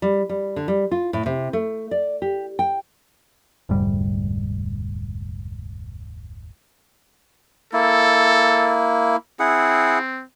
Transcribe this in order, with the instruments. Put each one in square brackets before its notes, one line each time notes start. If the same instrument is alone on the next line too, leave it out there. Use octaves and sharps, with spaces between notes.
[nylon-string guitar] G3
G3
D3
G3
F4
A2
C3
A3
D5
G4
G5
[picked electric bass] F1 D2 G#2 G3
[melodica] A#3 E4 [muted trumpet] A4
[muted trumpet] C4 [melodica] E4 G#4 F#5